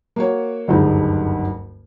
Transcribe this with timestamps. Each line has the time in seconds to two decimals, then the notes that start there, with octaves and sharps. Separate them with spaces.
0.16 A#3 F#4 C#5
0.68 F#1 D2 G2 G#3 D#4